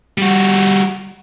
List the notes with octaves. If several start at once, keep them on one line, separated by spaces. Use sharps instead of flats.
G3 F#4